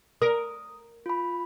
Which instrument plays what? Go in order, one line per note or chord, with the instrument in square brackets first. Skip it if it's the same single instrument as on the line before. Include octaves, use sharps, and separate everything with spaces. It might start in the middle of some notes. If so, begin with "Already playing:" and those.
[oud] A#4 [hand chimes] D#6
[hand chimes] F4 B5